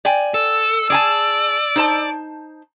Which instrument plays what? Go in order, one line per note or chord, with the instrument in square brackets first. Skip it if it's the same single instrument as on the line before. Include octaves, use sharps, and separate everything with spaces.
[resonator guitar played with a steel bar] D5 G5 G#5
[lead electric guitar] A4 [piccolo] E6
[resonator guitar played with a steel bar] G#4 G#5 A5 [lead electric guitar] D5
[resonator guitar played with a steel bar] D#4 C5 A5